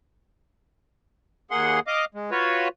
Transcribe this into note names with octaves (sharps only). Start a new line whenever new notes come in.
D#2 A#3 G#4 F#5 C6
D#5 F5 D6
G#3
F4 F#4 B4 C#5